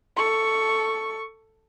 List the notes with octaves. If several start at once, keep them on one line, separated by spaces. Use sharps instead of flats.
A4 C#6